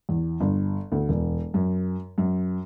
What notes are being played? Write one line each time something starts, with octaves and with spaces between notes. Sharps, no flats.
E2
G1
D2
E1
F#2
F#2